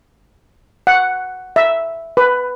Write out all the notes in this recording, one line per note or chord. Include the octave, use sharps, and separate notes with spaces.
F#5
E5
B4